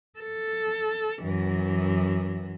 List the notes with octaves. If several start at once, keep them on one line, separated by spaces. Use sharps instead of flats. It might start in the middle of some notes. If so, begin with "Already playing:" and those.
A4
F#2 E3